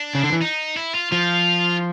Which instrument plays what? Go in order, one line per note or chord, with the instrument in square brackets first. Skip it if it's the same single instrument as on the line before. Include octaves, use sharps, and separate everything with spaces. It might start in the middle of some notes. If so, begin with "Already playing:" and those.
Already playing: [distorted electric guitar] D4
[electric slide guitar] C#3
D3
E3
[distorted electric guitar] D#4
E4
F4
[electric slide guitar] F3 [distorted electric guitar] F4